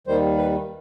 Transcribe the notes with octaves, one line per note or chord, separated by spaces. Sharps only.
D#2 D#3 G3 C5
B4